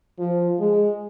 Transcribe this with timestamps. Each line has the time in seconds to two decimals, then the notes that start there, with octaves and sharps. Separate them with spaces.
0.19 F3
0.60 G#3